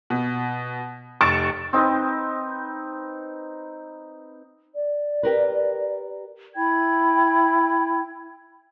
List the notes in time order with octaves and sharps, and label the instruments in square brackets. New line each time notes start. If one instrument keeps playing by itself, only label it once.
[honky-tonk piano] B2
F1 C#6 A6 D7 E7
[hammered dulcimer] C4 D#4 B4
[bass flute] D5
[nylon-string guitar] G4 A#4 B4
[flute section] E4 G5 B5 G#6